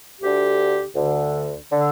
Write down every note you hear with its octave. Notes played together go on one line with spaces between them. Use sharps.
D2 D3 G4
D2 D3
D3